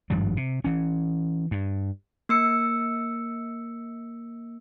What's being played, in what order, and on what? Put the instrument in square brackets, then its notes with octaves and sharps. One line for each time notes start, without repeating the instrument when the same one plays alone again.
[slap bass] G#1 G2 F3 G3
C3
E3 C#4
G2
[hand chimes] A#3 E6 C#7